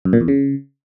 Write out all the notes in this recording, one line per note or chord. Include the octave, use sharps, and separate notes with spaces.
F#2
A#2
E2
C#3